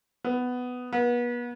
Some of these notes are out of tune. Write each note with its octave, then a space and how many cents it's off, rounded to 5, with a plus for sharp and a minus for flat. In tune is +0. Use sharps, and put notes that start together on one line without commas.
B3 +10
B3 -35